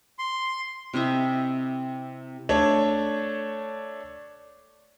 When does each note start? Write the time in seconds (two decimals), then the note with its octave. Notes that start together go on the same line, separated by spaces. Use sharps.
0.19 C6
0.94 C3 E4 D#5 E5
2.49 A3 D4 C#5